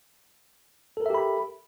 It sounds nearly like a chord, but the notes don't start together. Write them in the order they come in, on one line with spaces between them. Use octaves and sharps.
A4 A#4 E5 G4 B5